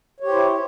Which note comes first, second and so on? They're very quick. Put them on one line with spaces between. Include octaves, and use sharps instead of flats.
C#5 G4 C5 E4